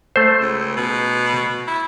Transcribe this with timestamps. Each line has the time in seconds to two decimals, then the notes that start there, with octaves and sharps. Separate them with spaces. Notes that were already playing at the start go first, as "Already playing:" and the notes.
0.16 A3 C5
0.40 C#2
0.77 B2
1.67 E4